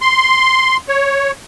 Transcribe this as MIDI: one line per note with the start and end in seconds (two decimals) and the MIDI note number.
0.01 0.77 84
0.88 1.31 73